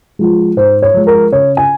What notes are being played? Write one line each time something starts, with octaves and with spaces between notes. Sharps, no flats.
F3 G#3
G#2 C5
C#5
F3 G#3
A#4
C#3 C#5
G#5